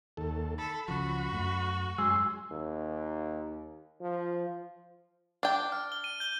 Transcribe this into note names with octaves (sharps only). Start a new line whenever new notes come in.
D#2 A4
A4 B5
C#2 C#3 F3 F#4
F#2 A3
F#2 G#3 G#5 C6 E6
D#2
F3
D4 G5
F6
G7
D#7
G6 G7